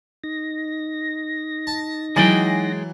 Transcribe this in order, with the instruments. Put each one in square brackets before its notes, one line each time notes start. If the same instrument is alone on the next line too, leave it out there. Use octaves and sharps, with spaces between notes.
[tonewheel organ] D#4 A#6
[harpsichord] A5
[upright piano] E3 A6 F#7 [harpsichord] F#3 [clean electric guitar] G#3 G#4 G5